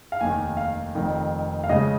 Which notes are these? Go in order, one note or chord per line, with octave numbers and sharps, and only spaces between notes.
F5
F1 D#2 D#3 G#5
F5
F1 F2 D#3
F5
C#2 C#3 D#5